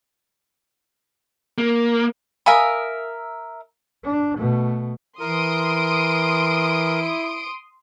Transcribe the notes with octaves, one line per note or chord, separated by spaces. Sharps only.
A#3
A#4 E5 F5 G#5 B5 D#6
D4
B2 A3
E3 E4 A#4 C6 D#6 D7